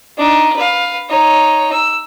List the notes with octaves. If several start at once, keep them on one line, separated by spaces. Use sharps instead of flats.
D4 D#4
B4 F5
D#4 C#5
E6